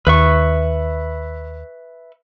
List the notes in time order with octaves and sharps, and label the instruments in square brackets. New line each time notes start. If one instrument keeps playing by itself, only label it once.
[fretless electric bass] D#2 [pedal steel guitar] B4 E5 C#6